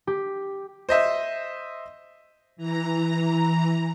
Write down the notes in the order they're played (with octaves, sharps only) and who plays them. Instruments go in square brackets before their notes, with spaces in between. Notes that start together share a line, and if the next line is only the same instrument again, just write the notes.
[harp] G4
[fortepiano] C5 D#5 E5
[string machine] E3 A#5